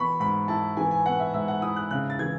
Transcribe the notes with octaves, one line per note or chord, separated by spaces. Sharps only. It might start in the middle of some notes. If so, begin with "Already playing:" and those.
Already playing: E3 B3 B5 C#6
G#2 B5
E4 A5
E3 G#5
G#5
B3 F#5
E5
G#2 E5
F#5
E4 D#6
F#6
C#3 F#6
A6
E3 G#6